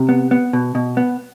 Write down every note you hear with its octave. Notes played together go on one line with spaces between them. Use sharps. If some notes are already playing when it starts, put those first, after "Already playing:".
Already playing: C3
B3
B3
B2
B2
B3